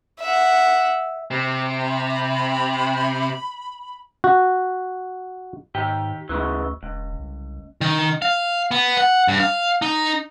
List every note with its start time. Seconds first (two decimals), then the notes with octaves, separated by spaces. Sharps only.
0.21 E5 F#5
1.31 C3 B5
4.24 F#4
5.75 G#2 D#3 G4 G5
6.29 D2 G#2 C#3 E3
6.83 E1 C#2
7.19 C2
7.81 D#3
8.22 F5
8.71 B3
8.97 F#5
9.28 G2
9.40 F5
9.82 D#4